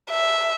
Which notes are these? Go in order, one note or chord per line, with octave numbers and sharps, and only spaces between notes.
E5